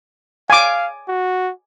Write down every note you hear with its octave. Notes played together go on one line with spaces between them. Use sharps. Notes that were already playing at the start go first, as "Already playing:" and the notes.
F5 G#5 D6
F#4